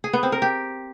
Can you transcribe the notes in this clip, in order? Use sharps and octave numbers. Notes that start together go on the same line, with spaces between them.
G#4
B3
C4
A#4
G4